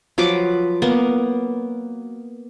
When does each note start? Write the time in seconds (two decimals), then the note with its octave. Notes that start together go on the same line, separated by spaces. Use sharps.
0.18 F3 F#3 B4 D6
0.82 A#3 B3